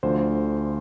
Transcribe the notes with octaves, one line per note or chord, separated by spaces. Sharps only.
D2 D3 F3 C5